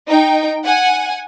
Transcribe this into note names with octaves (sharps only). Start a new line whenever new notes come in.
D#4 G5
F#5 G#5